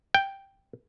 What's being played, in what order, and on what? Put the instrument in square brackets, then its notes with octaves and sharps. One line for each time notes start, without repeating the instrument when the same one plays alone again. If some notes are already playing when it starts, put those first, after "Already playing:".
[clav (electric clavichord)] G5